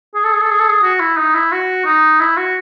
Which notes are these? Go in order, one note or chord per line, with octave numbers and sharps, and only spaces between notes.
G#4
A4
G#4
A4
G#4
A4
G#4
F#4
E4
D#4
E4
F#4
D#4
E4
F#4